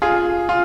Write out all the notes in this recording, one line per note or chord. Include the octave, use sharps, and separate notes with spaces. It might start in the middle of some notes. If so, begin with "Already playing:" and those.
F4 G#4
F4